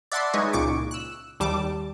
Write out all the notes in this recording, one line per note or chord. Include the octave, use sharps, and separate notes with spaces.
D5 E5 F#5 A5 B5 C6
G#3 D#4 E4 B4 C#5 D#5
C#2 A#2 C#6 D6 D7
E6 F#6
D#2 G3 A5 D6